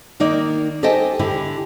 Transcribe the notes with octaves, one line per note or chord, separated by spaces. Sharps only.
D#3 A#3 D#4 D5
G4 A4 C5 D#5 G5 G#5
D3 E4 G4